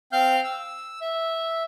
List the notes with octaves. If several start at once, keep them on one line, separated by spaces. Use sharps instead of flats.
C4 F5 F6 G6
E6
E5